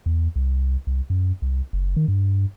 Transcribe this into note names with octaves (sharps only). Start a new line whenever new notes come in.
E2
C2
C2
F#2
C2
F#1
D#3
G2